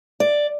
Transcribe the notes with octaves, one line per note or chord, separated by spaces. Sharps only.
D5